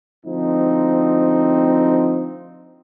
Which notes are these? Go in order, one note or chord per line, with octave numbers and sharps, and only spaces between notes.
D2 F3 C4 D#4